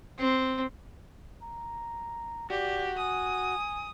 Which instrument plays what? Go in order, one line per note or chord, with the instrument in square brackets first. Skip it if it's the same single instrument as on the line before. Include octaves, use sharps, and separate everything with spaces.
[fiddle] C4
[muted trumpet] A#5
[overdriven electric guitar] F#4 [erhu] G4 [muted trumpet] D5
[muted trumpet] G#5 [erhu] D#6